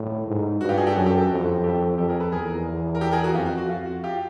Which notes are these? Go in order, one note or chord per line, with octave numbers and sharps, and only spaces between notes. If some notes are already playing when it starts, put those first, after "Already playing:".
Already playing: A2
G#2
G2 F#4
F4 G4
F#4 G#4
G4 A4
F#2 F#4 G#4
G4 A4
G4 A4
F2 F#4
G4 A4
F2 G4 A4
G#4 A#4
A4 B4
E2 G#4 A#4
A#4
G4 A4
G#4 A#4
F#4 G#4
F2 F4 G4
F#4
F#4
F2 F4
F#4
F4 G4